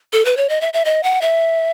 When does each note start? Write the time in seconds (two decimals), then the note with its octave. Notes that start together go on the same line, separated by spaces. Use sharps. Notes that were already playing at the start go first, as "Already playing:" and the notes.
0.13 A4
0.25 B4
0.37 C#5
0.49 D#5
0.61 E5
0.73 E5
0.85 D#5
1.03 F#5
1.21 E5